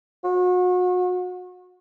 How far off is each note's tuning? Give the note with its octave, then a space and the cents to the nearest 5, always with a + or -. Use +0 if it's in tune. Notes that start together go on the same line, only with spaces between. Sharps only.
F#4 -35